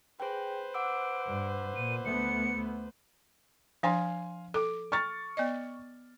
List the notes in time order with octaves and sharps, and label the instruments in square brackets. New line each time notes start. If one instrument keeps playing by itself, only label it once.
[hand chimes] G#4 G5 [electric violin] B4 C5
[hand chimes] F#5 D6 E6 [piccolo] D7
[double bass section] G2
[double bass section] A#2 [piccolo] D#7
[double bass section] D2 A3 B3 [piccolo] C#7
[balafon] F3 D4 C5 [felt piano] F5 G#5 C6
[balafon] A4 [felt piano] D6
[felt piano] C#6 F6 A6
[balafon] B3 D5 D#5